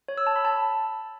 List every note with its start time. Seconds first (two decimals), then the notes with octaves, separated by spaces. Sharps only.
0.08 C#5
0.18 E6
0.27 A5
0.36 B5
0.45 A5